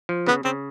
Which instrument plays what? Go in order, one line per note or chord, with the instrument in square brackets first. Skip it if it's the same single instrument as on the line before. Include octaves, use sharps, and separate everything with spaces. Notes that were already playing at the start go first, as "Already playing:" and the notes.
[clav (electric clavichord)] F3
[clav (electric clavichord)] C#3 [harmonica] B3
[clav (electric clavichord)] C#3 [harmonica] C4